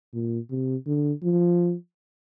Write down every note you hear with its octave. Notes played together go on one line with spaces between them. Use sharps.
A#2
C3
D3
F3